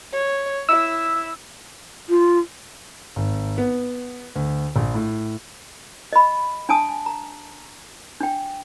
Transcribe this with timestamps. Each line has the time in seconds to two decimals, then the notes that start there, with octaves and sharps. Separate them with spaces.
0.13 C#5
0.69 E4 E6
2.09 F4
3.16 G#1
3.58 B3
4.36 D2
4.76 A#1
4.94 A2
6.13 D#5 B5
6.69 D4 G#5 A5 D#6
7.06 A#5
8.20 D4 G5